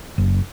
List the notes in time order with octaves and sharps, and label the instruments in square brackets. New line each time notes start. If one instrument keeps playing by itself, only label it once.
[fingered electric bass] F#1